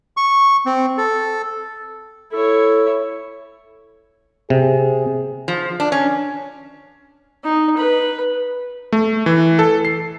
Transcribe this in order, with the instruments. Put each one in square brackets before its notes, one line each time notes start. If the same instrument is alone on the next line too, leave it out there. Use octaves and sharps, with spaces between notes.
[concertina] C#6
C4
A4
[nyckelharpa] E4 C#5 [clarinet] A4
[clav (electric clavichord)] C3 [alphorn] G#4
[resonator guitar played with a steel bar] F3
D4
C#4
[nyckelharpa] D#4
B4
[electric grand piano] A3
E3
A4
C7